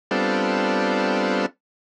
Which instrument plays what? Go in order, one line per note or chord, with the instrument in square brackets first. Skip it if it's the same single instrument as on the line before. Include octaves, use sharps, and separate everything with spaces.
[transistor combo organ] G3 B3 C4 D4 F4 A4